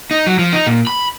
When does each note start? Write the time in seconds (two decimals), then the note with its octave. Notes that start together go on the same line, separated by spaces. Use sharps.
0.11 D#4
0.27 F#3
0.39 F3
0.53 D#4
0.67 A#2
0.87 B5